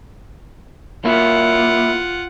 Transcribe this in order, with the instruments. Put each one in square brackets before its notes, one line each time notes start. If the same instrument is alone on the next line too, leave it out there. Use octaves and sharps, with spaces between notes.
[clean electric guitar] A#3 E4 [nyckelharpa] F4 F#5